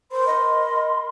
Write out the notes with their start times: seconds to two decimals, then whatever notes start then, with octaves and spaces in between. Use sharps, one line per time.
0.11 A#4 C5 B5 C6
0.27 D#5